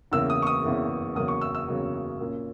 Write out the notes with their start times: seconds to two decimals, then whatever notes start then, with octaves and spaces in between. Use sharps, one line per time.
0.12 E2 C#3 E3 A#3 E6
0.30 D#6
0.42 C#6
0.47 D#6
0.63 E2 C#3 E3 A#3
1.15 E2 C#3 F#3 A#3 D#6
1.28 C#6
1.41 E6
1.55 E6
1.68 E2 C#3 F#3 A#3
2.20 A#2 A#3 C#4